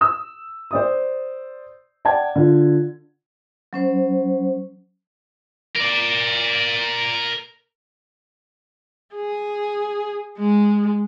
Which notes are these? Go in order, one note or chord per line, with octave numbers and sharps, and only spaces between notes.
D#6 E6
C5 D5 D#6
D5 F#5 G5 A5 G#6
D3 F4
F#3 C#4 C5
A#4 D5
G#4
G#3